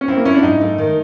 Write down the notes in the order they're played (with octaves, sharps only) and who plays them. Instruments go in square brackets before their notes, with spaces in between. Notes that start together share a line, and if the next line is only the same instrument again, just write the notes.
[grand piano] C#4
[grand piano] C4 [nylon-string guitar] E4
[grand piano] A#3
[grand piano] C#4 [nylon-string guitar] E4
[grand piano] D4
[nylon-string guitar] G#2 [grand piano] D#4
[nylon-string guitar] A3
D#3